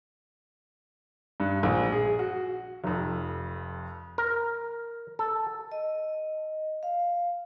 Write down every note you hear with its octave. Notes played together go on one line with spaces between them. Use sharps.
G2
A#1
G#4
F#4
F1 F2
A#4
A4
D#5
F5